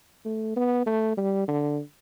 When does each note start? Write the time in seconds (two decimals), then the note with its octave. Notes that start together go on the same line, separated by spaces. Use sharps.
0.25 A3
0.56 B3
0.86 A3
1.17 G3
1.48 D3